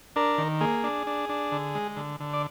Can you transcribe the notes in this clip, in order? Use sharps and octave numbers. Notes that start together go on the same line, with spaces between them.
D4 A#4
D#3
A#3 G#4
D4
D4
D4
D3
G#3
D3
D3
D5